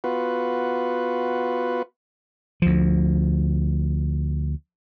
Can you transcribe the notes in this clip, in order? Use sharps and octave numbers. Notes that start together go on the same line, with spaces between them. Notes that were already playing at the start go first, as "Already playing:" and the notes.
B3 F4 F#4 B4
D2 F3